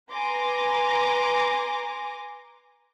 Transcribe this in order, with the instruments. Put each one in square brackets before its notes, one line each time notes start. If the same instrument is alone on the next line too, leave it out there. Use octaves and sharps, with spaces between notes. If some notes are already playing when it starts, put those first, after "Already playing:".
[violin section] B4 G#5 A#5 C6 D6 A#6